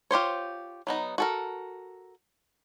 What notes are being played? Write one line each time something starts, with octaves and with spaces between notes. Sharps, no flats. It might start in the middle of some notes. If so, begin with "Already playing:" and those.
F4 G4 C5 C#5
F#3 B3 D#4
F#4 A4 A#4